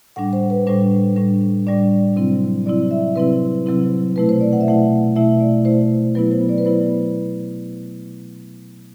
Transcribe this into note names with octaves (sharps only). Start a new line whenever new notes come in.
A2 G3 D4 F#5
C5
B4
A2 G3 D4 C5
A2 G3 D4
A2 G3 D4 D5
C3 F#3 C4 E4
C3 F#3 C4 E4 D5
E5
C3 F#3 C4 E4 B4
C3 F#3 C4 E4
B2 A3 E4 B4
C5
D5
F#5
E5
B2 A3 E4 F#5
B2 A3 E4 E5
D5
B2 A3 E4 C5
F#3 B3 E4 B4
C5
D5
B4
F#3 B3 E4 C5